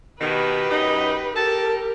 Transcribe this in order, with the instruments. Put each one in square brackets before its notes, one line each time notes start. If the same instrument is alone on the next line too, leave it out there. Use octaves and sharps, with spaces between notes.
[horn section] B2 D#3 [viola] G4 B4
[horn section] F#2 D#4
[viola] G4 A#4 [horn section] A4 A5